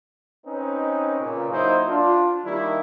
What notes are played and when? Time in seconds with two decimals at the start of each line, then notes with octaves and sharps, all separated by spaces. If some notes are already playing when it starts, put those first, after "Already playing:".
0.47 C4 C#4 D#4 B4
1.21 A#2 C#3
1.52 F#3 A#3 D#4 E4 C5
1.89 D4 F4
2.45 D#3 G3 A#3 D4 E4